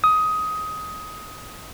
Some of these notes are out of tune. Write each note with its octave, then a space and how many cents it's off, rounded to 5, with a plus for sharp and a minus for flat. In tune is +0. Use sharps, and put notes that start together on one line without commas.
D#6 +15